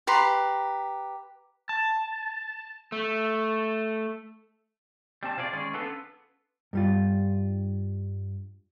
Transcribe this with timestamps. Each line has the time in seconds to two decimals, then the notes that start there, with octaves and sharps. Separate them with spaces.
0.07 G4 B4 A#5 C6
1.69 A5
2.92 A3
5.23 G3 C4 A5
5.37 C3 F4 G#4 B4 D5
5.53 D#3 G#3 C#4 G#4 D5
5.74 B3 C#4 D4 F4 A4 B4
6.73 G2 G3 F4